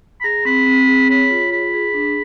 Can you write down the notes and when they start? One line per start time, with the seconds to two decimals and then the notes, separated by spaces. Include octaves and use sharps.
0.20 B5
0.24 G#4 A#5
0.45 C4 B5
0.66 C4
0.88 G#4
1.09 C#5 B5
1.30 F4
1.52 G#4 B5
1.74 G#4
1.94 D4